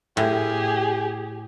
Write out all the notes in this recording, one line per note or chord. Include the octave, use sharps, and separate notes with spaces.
A2 G4 G#4